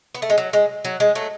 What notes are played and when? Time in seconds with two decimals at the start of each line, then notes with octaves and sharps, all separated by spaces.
0.15 B3
0.22 A3
0.30 G#3
0.38 F#3
0.53 G#3
0.85 F#3
1.00 G#3
1.15 F#3 A3